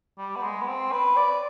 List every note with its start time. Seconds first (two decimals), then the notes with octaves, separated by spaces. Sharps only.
0.18 G3
0.36 B3
0.43 G#3
0.62 B3
0.68 C4
0.92 B4
1.17 D5